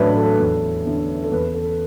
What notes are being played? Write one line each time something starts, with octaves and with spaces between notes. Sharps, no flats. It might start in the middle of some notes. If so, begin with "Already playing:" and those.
Already playing: A1 A2 F#3 D4 B4 D5 A5
A4
E2
D3 B3 E4
A4
E2 B4
A4